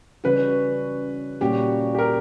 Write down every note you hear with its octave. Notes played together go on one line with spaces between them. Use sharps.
C#3 E3 G3 C#4 F#4 B4
A#2 G3 A#3 C#4 F#4 G4
G4
A#4